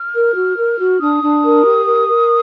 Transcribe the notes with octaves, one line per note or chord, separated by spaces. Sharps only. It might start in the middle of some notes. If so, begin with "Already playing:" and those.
Already playing: F6
A#4
F#4
A#4
F#4
D4 D#6
D4
A#4
G4
A#4
A#4